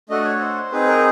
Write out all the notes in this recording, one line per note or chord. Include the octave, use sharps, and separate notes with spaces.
A3 D4 F#4 A4 D#5
C#5
C5
C4 D#4 G#4 B4
A#4